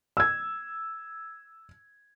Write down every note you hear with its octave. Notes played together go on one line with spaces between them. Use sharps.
E6 G#6